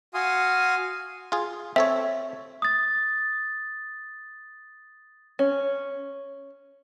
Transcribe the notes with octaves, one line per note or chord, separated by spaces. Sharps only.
F#4 F5 G#5 C6 D#6
F4 G#4
C4 A4 C#5 E5
D#6 A6
C#4